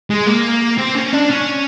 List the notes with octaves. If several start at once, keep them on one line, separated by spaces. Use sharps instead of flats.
G#3
A#3
C4
C#4
D4
C#4